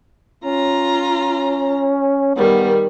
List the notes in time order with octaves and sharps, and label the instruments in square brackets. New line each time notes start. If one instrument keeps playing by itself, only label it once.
[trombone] C#4 [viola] F4 A#5
[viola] D#3 G3 [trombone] B3